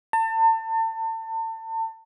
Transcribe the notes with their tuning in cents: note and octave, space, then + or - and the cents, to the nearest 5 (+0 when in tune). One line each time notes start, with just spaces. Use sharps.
A5 +35